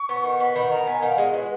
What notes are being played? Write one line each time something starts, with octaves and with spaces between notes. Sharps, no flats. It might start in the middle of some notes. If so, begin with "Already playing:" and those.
Already playing: C#6
B3
D#3
B3
D#3 B5
D#3 A#5
B3 G#5
D#3 F5
G#3 D#5
F#4 B4